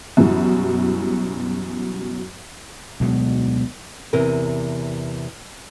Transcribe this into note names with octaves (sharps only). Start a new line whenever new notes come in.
F#2 B2 E3 G3
D2 B2 F#3 G#3
E2 C3 A#4